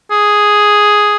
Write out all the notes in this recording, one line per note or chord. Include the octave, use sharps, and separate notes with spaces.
G#4